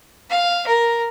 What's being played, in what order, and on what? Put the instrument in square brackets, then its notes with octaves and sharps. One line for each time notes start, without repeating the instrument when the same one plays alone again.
[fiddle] F5
A#4